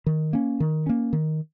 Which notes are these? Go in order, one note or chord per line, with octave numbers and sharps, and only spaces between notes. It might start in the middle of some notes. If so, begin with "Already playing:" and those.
D#3
A#3 C#4
D#3
A#3 C#4
D#3